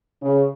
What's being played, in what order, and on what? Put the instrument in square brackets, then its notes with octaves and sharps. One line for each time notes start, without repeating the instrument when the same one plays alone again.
[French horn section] C#3